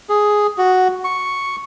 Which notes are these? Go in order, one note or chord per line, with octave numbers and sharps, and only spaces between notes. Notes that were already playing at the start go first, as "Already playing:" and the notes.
G#4
F#4
C#6